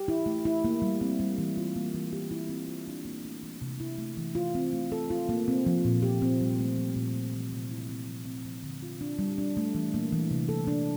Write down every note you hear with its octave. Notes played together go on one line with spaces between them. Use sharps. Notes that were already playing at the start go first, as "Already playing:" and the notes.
Already playing: G4
E4
A3
E4
A#3
G3
C4
G3
E3
F4
A#3
E3
G4
E4
C4
F4
D4
A#3
A3
E3
C3
E4
A3
E3
F4
C4
A3
A4
F4
A#3
C4
F3
A#2
G4
C4
G3
A3
F3
A#2
A#3
E3
C3
E4
C4
F3
C4
F3
D3
F4
D4
G3
D4
A3
E3
A#3
E3
C3
A4
D4